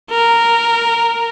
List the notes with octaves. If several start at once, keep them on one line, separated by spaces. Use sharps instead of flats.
A#4